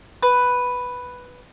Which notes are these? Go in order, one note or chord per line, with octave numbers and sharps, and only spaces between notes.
B4